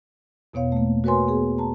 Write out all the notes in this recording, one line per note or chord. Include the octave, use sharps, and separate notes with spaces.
E2 B2 B3 C#5 F5
A3 A#3
F#4 A#4 B4 C#5 G#5 C6
B3 G#4
A5 A#5